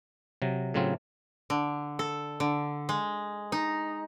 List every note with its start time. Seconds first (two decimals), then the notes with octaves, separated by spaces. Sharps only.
0.42 C3 F#3
0.74 A2 C#3 F#3 C4 F4
1.50 D3
1.99 A4
2.40 D3
2.89 G#3
3.52 D#4